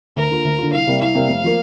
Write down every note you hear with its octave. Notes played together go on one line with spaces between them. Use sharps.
D2 A#4
D3 A#3 F4
D2
D3 A#3 F4
C2 F5
C3 G3 A#3
C2 F5
C3 G3 A#3
F1
F3 A#3